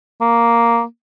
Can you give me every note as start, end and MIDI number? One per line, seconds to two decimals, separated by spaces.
0.21 0.83 58